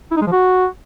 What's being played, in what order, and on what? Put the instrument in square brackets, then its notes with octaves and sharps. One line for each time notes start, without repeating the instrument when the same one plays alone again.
[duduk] E4
D#4
G#3
F3
F#4